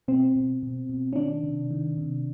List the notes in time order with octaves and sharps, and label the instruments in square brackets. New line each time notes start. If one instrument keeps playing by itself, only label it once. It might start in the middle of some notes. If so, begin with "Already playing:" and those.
[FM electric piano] B2 C4
B2
B2
B2
C#4
D#3 D4
C3
D#3
C3